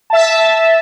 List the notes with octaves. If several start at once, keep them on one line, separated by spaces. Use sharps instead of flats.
E5 A5